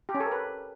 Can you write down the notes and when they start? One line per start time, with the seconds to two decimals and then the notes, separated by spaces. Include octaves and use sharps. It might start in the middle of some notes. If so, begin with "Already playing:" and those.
0.09 G4
0.14 C#4
0.20 A4
0.26 A#4
0.32 B4